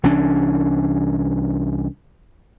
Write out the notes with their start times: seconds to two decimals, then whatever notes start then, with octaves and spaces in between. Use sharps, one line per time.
0.03 C2 E3 C#4 D4